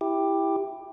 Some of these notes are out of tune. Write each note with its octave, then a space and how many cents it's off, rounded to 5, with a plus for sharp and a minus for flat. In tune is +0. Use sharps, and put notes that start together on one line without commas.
E4 +0 G4 +10